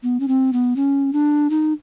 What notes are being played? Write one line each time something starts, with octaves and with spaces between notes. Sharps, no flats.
B3
C#4
C4
B3
C#4
D4
D#4